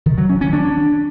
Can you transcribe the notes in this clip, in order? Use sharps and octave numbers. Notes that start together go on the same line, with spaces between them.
D#3
F#3
C#4
C#4
D4